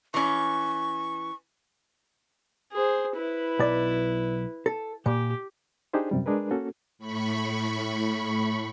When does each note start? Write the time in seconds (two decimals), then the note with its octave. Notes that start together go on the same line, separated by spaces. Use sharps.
0.14 E3 C#4 C#6
2.72 G#4 C5
3.16 E4 B4
3.59 B1 D5
4.66 A4
5.06 A#2 G4
5.93 D4 D#4 G4 G#4 C5
6.11 F#2 C3 G3
6.26 G#3 D4 G#4 A#4 B4
6.51 A#3 C#4 F#4 A4
6.98 A2 B5 C#6